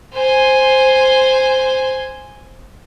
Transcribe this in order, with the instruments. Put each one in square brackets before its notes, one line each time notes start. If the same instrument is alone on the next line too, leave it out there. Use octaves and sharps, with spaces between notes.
[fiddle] C5 G#5